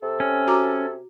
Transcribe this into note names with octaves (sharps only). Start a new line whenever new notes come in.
C3 A4
C#4
F#4 A#5 D6